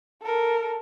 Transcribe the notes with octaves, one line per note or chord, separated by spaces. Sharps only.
A4 A#4